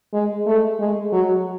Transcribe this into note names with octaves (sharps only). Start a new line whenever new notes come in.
G#3
A3
G#3
F#3